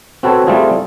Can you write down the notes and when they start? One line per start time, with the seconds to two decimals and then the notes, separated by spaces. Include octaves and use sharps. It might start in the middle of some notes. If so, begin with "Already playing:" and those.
0.23 C4 F#4 A4 B4 C#5
0.47 G3 A3 C4 F4 G#4